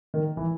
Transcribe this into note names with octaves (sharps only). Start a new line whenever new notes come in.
D#3
E3